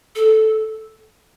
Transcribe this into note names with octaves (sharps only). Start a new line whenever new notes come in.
A4